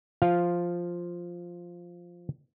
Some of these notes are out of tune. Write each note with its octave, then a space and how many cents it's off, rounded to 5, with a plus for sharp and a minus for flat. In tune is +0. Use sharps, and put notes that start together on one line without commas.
F3 +0 F4 +0 F5 +0